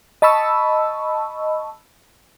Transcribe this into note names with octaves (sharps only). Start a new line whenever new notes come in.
D#5 A5 B5 C#6 E6